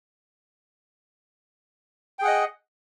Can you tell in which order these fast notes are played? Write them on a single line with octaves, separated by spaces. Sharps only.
G5 G#4 F#5 D#5